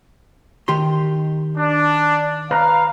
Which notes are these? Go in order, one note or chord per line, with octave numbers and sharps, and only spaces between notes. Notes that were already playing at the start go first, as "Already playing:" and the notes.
D#3 G4 C6
D4
B4 F5 A#5